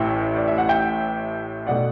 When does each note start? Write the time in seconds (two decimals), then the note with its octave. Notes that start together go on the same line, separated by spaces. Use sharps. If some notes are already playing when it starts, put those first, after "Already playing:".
Already playing: A1 A2 E3 E5 G5
0.36 D5
0.48 E5
0.58 F#5
0.69 E5 G5
1.67 B2 A3 D5 F#5